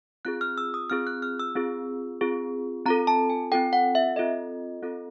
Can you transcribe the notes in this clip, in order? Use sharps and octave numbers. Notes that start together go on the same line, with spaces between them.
C4 F4 G#4 F#6
F6
E6
D#6
C4 F4 G#4 F6
F#6
F6
E6
C4 F4 G#4
C4 F4 G#4
C4 F4 A4 A#5
A5
G#5
C4 F4 A4 G5
F#5
E5
C4 F4 A4 D#5
C4 F4 A4